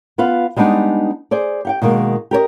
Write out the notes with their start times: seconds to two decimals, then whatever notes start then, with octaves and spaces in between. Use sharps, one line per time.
0.18 B3 F4 B4 F5
0.56 G3 G#3 B3 D4 D#4
1.31 G#4 C5 D5
1.65 G4 F#5 G5
1.82 B2 D#3 G#3 A#3
2.31 G4 A#4 C#5 D#5